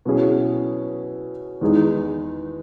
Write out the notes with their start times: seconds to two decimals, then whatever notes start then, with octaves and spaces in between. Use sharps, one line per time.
0.05 B2 F#3 C#4 E4 G#4
1.61 E2 D#3 G#3 D#4 G#4